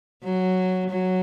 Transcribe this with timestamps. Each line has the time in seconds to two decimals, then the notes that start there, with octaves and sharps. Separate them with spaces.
0.23 F#3
0.90 F#3